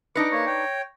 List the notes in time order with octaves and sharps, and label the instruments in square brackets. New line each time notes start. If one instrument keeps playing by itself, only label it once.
[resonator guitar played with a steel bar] D4 D#4 B4 [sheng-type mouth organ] D6 [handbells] A#6 C#7
[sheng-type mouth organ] A#3 C#5 [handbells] C#6 A#6
[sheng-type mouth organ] C#5 G5